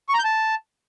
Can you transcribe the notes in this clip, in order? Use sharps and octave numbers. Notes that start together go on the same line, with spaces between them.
C#6
A#5
G6
A5